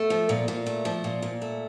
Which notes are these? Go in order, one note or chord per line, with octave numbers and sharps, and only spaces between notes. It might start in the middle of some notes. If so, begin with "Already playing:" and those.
Already playing: A3
F3
A#2
A#2
A3
F3
A#2
A#2
A3